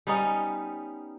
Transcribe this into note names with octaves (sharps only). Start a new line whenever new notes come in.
G3 B3 C#4 D#4